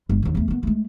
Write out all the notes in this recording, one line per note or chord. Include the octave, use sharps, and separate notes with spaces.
G1 G#3
D#2 D3
E2 A3
D#3 B3
G#3 A3